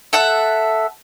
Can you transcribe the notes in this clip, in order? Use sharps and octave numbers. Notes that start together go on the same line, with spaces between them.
A4 E5 F#5